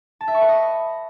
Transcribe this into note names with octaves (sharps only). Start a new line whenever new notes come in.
A5
E5
C#6
B4
D#5